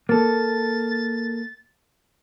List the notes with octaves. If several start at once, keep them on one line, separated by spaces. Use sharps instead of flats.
A#3 A4 A6